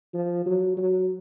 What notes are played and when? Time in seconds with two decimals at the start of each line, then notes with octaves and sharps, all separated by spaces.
0.14 F3
0.46 F#3
0.78 F#3